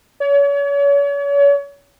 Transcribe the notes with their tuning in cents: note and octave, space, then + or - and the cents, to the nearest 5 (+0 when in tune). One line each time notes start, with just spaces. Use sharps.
C#5 +35